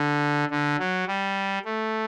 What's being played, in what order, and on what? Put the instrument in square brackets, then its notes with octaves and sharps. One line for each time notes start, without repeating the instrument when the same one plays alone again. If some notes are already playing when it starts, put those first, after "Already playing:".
Already playing: [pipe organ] D3
D3
F#3
G3
A3